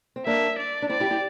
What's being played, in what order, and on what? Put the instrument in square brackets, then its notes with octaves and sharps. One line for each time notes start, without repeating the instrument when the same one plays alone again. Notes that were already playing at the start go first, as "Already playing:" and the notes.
[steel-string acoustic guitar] C4
[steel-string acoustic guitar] A#3 D4 [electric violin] E5
[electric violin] D5
[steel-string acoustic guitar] D4
[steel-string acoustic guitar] C4 E4 [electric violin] D5
[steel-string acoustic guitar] E4 G4
E4 G4